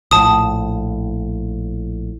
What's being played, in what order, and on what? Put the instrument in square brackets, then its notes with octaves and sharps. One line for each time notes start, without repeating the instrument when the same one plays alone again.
[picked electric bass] A#1 A2 [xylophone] A5 D#6